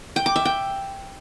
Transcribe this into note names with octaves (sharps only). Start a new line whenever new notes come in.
G5
D6
E5
G5